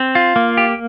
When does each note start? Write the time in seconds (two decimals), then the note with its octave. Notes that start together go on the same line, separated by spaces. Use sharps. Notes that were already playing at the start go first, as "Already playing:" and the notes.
Already playing: C4
0.15 F4
0.36 A#3
0.57 G4